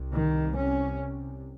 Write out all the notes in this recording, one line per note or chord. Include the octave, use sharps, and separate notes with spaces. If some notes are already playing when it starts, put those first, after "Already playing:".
Already playing: C2 C3
D#3
C#4